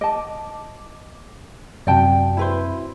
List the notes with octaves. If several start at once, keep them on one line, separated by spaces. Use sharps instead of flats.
D#5 A5 D6
F#2 C3 F#4 D5 G5 A5
E4 B4 C5